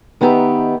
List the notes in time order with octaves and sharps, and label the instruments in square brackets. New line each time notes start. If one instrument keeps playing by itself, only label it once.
[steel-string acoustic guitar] D#3 B3 D#4 G4 E5